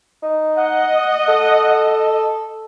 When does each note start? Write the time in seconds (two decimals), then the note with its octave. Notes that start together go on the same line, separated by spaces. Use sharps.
0.22 D#4
0.58 D#5 F#5
1.28 A4